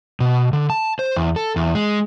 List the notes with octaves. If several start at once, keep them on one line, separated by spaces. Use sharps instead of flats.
B2
D3
A5
C5
E2
A4
E2
G#3